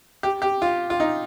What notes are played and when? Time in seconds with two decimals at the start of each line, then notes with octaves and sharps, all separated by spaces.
0.23 G4
0.42 G4
0.62 F4
0.90 F4
1.00 D#4